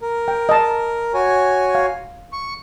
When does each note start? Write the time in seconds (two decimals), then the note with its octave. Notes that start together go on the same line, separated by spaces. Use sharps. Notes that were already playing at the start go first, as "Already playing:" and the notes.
0.01 A#4
0.28 G5
0.49 D#5 A5
1.14 F#4 C#5 G#5
1.75 F5
2.33 C#6